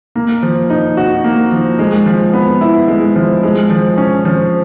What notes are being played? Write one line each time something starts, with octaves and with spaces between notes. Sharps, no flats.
A#3
F3
D#4
F#4
A#3
F3
G#3
F3
B3
E4
G#3
F3
G#3
F3
C#4
F3